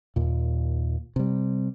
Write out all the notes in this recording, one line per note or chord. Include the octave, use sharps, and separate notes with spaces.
D#2 A#2
C3 G3